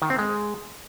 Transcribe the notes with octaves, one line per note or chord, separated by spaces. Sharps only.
D#3
C4
G#3